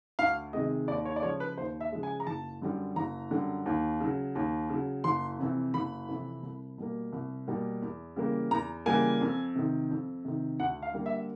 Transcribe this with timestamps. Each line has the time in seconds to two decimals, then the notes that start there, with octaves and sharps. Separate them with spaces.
0.19 D2 F5
0.53 C3 D#3 G#3 D#5
0.88 D#2 D5
1.05 C#5
1.16 D5
1.22 C#3 F3 G#3 C#5
1.40 B4
1.57 D#2 C5
1.81 E5
1.92 C#3 F3 G#3
2.03 G#5
2.20 A#5
2.27 F#1 A5
2.62 F#2 D3 G3
2.96 F#1 A#5
3.31 F#2 D3 G3
3.66 D#2
4.00 C#3 F#3
4.35 D#2
4.69 C#3 F#3
5.04 F#1 C6
5.39 F2 C3 E3
5.74 F#1 B5
6.09 F2 C3 E3
6.43 C2
6.78 B2 G3 A#3
7.12 C2
7.47 B2 G3 A#3
7.82 E2
8.16 C#3 E3 G3 A#3
8.51 E2 A#5
8.86 C#3 E3 G3 A#3 G#5
9.21 F2
9.56 C3 D#3
9.91 F2
10.25 C3 D#3
10.59 D2 F#5
10.82 F5
10.94 D3 G3 A#3
11.06 E5